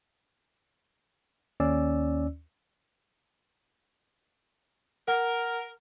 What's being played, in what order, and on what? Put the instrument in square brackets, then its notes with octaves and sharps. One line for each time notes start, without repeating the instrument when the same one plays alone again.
[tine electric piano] D#2 C#4 D5 E6
[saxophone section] A#4 [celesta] F#5